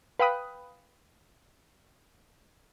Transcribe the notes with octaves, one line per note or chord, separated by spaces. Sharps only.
B4 F5 G5 B5 D#6 F#6